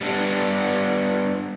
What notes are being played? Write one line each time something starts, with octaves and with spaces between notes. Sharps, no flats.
G3 B3 D4